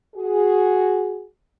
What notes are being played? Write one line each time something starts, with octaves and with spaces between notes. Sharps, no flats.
F#4 G#4